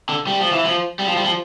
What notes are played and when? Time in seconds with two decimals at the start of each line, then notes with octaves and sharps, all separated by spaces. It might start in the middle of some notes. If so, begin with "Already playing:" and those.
0.09 D3
0.27 G3
0.40 F3
0.52 E3
0.65 F3
0.99 G3
1.08 F3
1.17 G3
1.25 F3